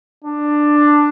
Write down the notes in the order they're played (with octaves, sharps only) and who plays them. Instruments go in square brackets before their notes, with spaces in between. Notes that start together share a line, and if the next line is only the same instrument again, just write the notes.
[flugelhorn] D4